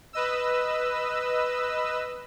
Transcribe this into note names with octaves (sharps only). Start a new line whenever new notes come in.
B4 D#5 E6